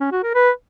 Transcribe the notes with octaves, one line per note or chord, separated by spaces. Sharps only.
C#4
F#4
A#4
B4